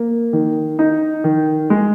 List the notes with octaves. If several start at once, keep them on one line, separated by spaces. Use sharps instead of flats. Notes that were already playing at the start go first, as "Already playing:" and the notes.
Already playing: A#3
D#3
D#4
D#3
G#3